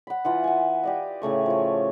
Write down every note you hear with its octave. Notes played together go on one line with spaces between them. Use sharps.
F#5 B5
E3 F4 F#5
F#5 G#5
G4 D5 D#5
A2 C#3 A3 C#6
F3 C#5